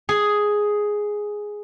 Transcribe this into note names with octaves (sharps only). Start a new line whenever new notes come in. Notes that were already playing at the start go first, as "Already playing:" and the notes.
G#4